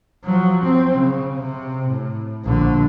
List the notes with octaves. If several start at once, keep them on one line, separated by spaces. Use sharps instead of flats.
F3 F#3
C4
C#3
C3
A2
A#1 D3